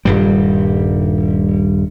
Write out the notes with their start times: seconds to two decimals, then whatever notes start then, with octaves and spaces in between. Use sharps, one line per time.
0.05 D#1 G2 G3